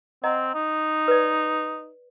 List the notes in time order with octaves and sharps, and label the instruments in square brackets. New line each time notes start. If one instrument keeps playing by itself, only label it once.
[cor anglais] C4 [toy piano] D#5 F#5 A#5
[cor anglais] D#4
[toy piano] B4 D5